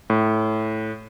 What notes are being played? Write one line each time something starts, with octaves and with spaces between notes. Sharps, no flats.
A2